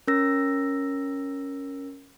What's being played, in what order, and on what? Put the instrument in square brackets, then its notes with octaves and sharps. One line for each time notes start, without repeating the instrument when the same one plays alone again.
[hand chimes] C#4 A#4 E6 A#6